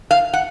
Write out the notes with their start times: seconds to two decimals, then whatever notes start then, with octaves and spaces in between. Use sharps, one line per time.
0.11 F5
0.33 F#5